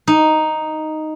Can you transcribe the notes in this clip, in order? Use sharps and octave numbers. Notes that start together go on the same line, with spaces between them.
D#4